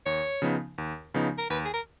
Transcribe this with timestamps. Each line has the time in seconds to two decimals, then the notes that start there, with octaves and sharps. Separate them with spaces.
0.06 D#2 C#5
0.42 C#3 F3 B3 D#4
0.78 D#2
1.14 C#3 F3 B3 D#4
1.39 A#4
1.50 D#2 B4
1.65 G#4
1.74 A#4